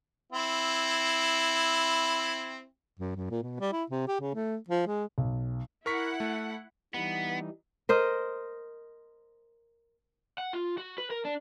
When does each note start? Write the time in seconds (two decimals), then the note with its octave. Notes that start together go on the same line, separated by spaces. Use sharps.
0.32 C4 E4
2.99 F#2
3.16 F#2
3.30 A#2
3.43 B2
3.60 G3
3.72 E4
3.90 C3
4.07 G4
4.21 C#3
4.35 A3
4.68 F3
4.87 G#3
5.18 B1
5.86 E4 A#4 F#5 C#6 B6
6.20 A3
6.94 E3 G3 B3 D#4
7.89 A#4 C5 D#5
10.38 F#5
10.53 F4
10.78 F#4
10.98 B4
11.10 A#4
11.25 D4